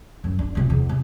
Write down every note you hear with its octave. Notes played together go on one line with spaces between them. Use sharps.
F#2
D4
C3 F4
E2
C3